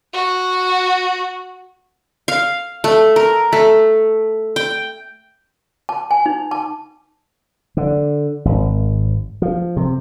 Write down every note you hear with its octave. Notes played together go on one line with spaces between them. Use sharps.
F#4
F5
A3
A#4
A3
G5
A5
G#5
D#4
A5
D3
G#1
F3
C3